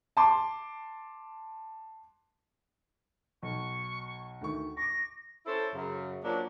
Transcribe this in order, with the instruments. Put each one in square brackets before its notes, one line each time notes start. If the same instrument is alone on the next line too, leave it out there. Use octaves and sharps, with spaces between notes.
[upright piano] A5 C6 D6
[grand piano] B1 [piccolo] C#6
[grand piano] D2 D#3 C#6
[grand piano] C#6 D6 [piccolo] A#6
[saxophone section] C#4 E4 A4 C5
F#2 C#3
F3 F#3 A#3 C#4 D4